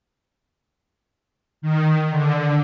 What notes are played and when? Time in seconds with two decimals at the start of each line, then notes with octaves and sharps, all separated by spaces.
1.62 D#3
2.10 D3